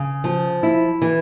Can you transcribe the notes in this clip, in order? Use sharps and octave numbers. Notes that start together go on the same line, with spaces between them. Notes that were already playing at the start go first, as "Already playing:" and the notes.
Already playing: C#3
F3
E4
E3